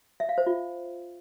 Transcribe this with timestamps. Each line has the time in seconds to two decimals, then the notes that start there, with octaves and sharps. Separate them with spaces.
0.20 E5
0.29 F5
0.38 C5
0.47 F4